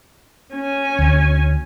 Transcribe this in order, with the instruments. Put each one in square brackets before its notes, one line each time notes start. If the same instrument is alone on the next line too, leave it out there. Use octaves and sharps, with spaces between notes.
[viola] C#4 G#5
[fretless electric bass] D2